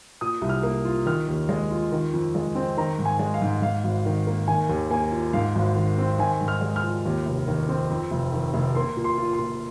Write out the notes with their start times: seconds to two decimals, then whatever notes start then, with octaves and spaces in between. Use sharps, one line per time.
0.21 A#2 D#6
0.41 C2
0.49 F6
0.63 A#3
0.85 F4
1.06 D#3 F6
1.28 D#2
1.49 G#3
1.71 F4
1.92 D#3
2.13 F2
2.35 G#3
2.55 C4
2.77 D#3 A#5
2.99 G#2
3.05 G#5
3.19 G#3
3.34 F5
3.42 G#2
3.62 G#2 F5
3.84 G#1
4.06 D#3
4.27 A#3
4.48 D#3 G#5
4.69 D#2
4.90 A#3 G#5
5.12 F4
5.33 G#2 F5
5.55 G#1
5.76 D#3
5.98 C4
6.19 D#3 G#5
6.41 G#2
6.48 F6
6.61 G#3
6.76 F6
6.83 F4
7.05 D#2
7.26 F1
7.48 D#3
7.69 C4
7.90 F2
8.11 F1
8.33 D#3
8.54 F1
8.75 A#3 C6
8.97 A#2
9.04 C6
9.18 F4
9.33 C6
9.39 A#2